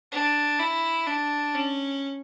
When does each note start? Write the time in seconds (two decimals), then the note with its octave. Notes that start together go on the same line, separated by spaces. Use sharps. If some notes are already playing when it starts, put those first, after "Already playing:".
0.12 D4
0.59 E4
1.07 D4
1.54 C#4